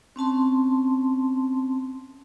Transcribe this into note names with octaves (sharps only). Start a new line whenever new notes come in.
C4 C#4 A5 C6